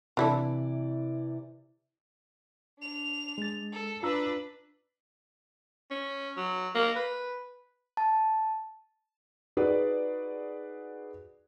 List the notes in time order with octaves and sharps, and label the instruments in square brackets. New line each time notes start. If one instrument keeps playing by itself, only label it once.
[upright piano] C3 E3 D5 [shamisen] D4 E4 A4
[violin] D4 F7
[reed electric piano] G#3 A6
[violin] A4
[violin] D4 B4 [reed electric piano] F4 A#5 E6
[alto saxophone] C#4
F#3
A#3
B4
[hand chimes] A5
[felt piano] D#4 F#4 G#4 B4 D5